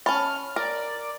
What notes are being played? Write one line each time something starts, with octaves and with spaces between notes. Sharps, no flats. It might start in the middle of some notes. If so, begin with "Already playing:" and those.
C#4 A5 B5 C#6 F6
A#4 D5